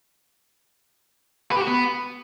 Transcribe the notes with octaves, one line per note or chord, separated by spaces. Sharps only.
B4
G4
F#4
B3